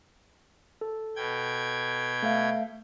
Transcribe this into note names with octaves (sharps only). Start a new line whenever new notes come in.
A4
B2 G5 G#6
A3 E5 F5